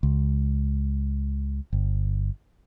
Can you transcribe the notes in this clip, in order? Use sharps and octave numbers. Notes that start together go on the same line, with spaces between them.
C#2
G1